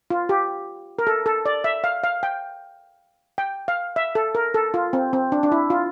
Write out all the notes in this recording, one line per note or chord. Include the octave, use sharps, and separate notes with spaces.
F4
G4
A#4
A4
A4
D5
E5
F5
F5
G5
G5
F5
E5
A4
A#4
A4
F4
C4
C4
D4
D4
E4
F4